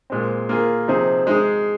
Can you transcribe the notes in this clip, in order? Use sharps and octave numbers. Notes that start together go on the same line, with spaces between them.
A#2 G#3 C4
A#3 F4 G#4
C3 F3 C4 D#4 G#4
G#3 D#4 G#4